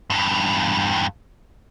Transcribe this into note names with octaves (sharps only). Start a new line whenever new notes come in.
E2 G2